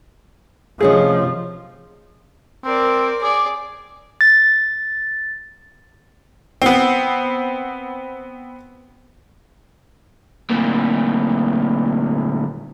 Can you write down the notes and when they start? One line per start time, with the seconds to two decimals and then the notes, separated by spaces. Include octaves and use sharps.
0.80 C3 F3 A3 C#4 G#4 D#5
2.64 C4 A#4 D5
3.22 G#4 D5 D6
4.21 A6
6.62 B3 C4
10.50 D2 A#2